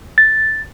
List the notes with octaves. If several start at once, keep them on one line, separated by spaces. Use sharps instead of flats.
A6